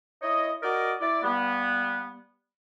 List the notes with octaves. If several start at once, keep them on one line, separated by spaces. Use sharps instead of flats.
E4 C#5 D#5
F#4 A#4 D5 D#5 D6
E4 D5
G3 A#3 B3